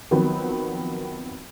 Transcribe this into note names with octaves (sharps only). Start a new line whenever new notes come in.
D#3 F3 F#3 B3 C4